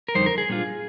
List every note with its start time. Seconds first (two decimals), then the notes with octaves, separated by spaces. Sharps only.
0.08 A#4
0.15 F2 D3 G3 D#4 C5
0.26 A#4
0.38 G#4
0.49 A#2 G3 D4 F4